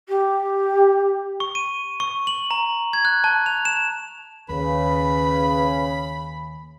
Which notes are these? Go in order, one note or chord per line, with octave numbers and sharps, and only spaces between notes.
G4
C#6
D#7
C#6
F#7
A#5
G#6
F#6
A5
F7
E7
D#2 C#3 B4 B5